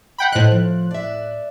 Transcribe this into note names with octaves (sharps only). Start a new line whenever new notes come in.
F#5 G5 B5
A2 C5 D#5 F#6
F3
D5 E5